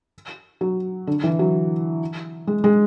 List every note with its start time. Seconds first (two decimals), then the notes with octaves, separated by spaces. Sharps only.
0.61 F#3
1.07 D3
1.24 E3
1.39 F#3
2.47 G#3
2.64 G#3